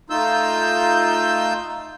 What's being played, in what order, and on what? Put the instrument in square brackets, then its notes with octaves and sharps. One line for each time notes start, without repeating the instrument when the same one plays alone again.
[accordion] A3 D#4 F4 E6 G6